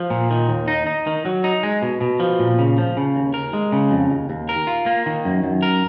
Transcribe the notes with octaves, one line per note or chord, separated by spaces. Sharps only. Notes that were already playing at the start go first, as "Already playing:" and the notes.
Already playing: F3
A#2
D#3
D#2
D#4
D#4
D#3
F#3
D#4
G#3
B2
B2
F3
A#2
C#3
F3
C#3
D#2
A#4
G#3
C#3
F2
D#2
D#2
A#4
F4
A#3
D#3
F#2
F#2
A#4